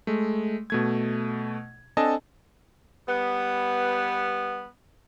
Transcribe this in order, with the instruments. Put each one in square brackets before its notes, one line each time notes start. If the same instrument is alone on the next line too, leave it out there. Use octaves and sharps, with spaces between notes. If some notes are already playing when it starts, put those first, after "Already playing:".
[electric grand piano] G#3 A3
B2 A3 G#6
C4 D4 A4 D#5 G#5 A5
[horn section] G3 B3